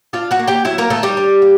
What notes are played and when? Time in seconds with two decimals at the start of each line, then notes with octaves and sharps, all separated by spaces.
0.13 D4 F4 F5
0.31 F#4 F#5
0.39 A#3
0.48 G4 G5
0.65 F#3 E4 E5
0.78 A#3 A#4
0.90 D#3 A3 A4
1.03 G3 G4
1.17 D4
1.42 A#3